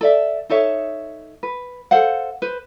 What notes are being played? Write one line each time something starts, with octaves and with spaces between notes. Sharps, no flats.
A4 D5 E5
D#4 A4 C#5 E5
B4
A4 C5 F5 F#5
B4 C5